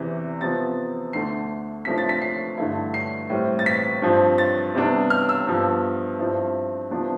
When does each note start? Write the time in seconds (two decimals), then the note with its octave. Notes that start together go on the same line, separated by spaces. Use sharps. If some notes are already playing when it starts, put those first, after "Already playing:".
Already playing: E2 C3 E3
0.41 C3 F3 B3 A6
1.13 D2 D3 A3 C7
1.85 C3 F3 A3 D4 B6
1.98 A6
2.09 B6
2.22 C7
2.58 G2 D3 A3 E4
2.94 C7
3.30 A2 G3 C4
3.59 A6
3.66 B6
4.02 G2 F3 C4
4.38 A6
4.75 C3 G3 B3 D4
5.10 F6
5.29 E6
5.47 G2 F3 B3
6.19 G2 F3 C4 E4
6.91 C3 F3 B3 D4